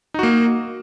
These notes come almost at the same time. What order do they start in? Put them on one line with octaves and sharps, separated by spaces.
D#4 F#4 A#3